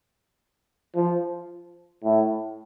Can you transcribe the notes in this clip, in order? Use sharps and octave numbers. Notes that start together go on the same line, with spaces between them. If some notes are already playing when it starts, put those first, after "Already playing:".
F3
A2